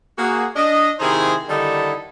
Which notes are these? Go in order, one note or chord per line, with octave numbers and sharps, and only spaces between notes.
A#3 F#4 G#4
D4 D#5
C3 D#3 D#4 E4 G#4 C5
D3 D#3 G3 D#4 E4 A4